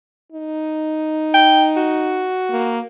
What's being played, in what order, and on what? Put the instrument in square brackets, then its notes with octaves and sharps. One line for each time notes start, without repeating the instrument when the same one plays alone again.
[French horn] D#4
[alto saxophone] G5
F#4
[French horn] A#3